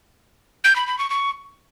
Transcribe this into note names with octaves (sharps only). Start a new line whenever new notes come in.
G6
B5
B5
C#6
C#6